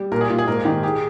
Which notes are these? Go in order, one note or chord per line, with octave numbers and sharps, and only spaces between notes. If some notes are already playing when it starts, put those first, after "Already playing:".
Already playing: G3
A#2 A#4
G#4
A#2 F4
G#4
G#2 A#4
D#3 G4
G4 G#4